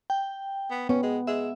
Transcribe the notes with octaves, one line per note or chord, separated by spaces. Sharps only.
G5
B3
B3 C#4
G#3
G#3 E5